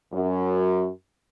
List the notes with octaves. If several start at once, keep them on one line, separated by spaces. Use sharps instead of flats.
F#2